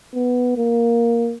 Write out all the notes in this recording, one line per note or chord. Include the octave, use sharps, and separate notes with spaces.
B3
A#3